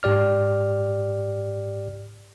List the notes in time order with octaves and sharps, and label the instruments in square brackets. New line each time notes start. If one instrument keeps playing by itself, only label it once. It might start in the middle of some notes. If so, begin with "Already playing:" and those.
[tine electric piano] G#2 G4 D5 F6